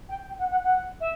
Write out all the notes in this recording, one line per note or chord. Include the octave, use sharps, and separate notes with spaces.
G5
G5
F#5
F#5
F#5
E5